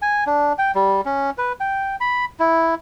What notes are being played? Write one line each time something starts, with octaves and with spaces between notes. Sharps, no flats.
G#5
D4
G5
G3
C#4
B4
G5
B5
E4